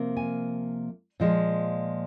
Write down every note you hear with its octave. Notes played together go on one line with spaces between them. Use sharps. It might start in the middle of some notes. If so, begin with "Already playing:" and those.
Already playing: C3 F3 A#3
G#5
A#2 F3 G#3